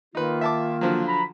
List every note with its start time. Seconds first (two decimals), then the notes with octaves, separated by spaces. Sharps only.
0.15 D#3 A#3 D#4 F4 B4
0.41 E5 A5 D6
0.81 D3 F3 F#3
1.07 A#5 B5